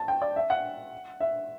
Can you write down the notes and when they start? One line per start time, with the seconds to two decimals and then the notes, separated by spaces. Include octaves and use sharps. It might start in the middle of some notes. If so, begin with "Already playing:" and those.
Already playing: A5
0.08 G5
0.22 D5
0.36 E5
0.50 F#5
1.20 E5